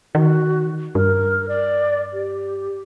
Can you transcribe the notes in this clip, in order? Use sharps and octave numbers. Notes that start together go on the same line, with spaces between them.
D#3 F#4
G2 A#4
D5
G4